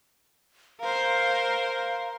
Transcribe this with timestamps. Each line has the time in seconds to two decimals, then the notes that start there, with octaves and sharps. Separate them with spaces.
0.80 A#4 C5 F5